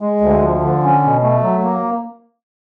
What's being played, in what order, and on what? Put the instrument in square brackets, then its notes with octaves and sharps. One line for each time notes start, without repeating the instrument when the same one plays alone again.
[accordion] G#3
D2
F3
D3
C#4
B2
A3
F#3
A#3